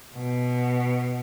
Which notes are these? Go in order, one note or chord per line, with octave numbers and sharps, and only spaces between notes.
B2